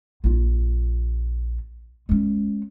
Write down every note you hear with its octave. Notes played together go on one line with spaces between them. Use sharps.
A#1 F4
G#3 C#4